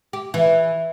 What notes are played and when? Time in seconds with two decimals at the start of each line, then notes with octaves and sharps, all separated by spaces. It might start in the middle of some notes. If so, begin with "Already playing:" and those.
0.13 G4
0.34 E3